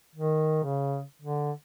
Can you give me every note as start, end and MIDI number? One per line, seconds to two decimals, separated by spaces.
0.15 0.62 51
0.64 1.03 49
1.22 1.52 50